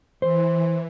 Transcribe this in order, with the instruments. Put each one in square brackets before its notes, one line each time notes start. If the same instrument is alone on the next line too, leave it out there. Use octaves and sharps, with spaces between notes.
[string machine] E3 [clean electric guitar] C5